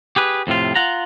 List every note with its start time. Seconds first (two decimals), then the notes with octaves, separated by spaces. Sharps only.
0.16 G4 G#4 B4
0.47 F2 A2 C3 F4
0.75 F4 F#5 A#5